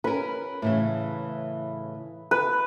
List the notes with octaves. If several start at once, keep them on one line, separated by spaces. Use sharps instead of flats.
C#4 A#4 B4
A2 C#3 E3
B4